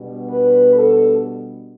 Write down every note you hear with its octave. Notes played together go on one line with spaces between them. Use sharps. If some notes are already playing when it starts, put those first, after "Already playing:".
Already playing: B2 G3 B3 D4
B4
A4